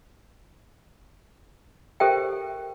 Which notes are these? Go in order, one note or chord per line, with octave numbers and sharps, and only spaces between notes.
G4 A4 A#4 C5 E5 G5